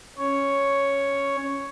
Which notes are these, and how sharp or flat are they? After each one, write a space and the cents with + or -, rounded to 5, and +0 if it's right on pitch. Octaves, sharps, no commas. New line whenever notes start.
C#4 +0 C#5 +0